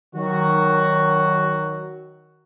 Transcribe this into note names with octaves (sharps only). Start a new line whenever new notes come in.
D#3 F#3 F#4